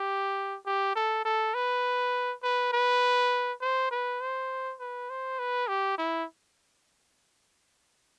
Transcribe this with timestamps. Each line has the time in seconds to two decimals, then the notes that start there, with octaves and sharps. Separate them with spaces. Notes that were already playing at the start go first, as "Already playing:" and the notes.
Already playing: G4
0.66 G4
0.96 A4
1.25 A4
1.54 B4
2.43 B4
2.73 B4
3.61 C5
3.91 B4
4.21 C5
4.80 B4
5.10 C5
5.39 B4
5.69 G4
5.98 E4